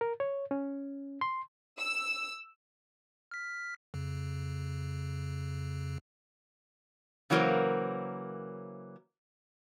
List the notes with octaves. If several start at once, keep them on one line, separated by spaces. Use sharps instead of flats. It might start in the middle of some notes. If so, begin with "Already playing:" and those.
A#4
C#5
C#4
C6
E6
F6 B6
F2 C#3
C#3 E3 F#3 A#3 A#4 C5